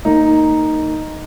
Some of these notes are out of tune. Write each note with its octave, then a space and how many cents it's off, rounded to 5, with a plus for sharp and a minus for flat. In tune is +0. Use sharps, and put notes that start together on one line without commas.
A#3 -15 D#4 +0